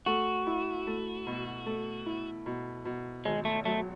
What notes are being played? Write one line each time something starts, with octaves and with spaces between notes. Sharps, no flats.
A3 F#4
E4
A3
B2
A3
E4
B2
B2
G#1 G#3
A3
F#3 A3